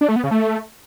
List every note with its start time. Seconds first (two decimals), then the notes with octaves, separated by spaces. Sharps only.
0.01 D4
0.08 A3
0.16 B3
0.24 C#3
0.31 A3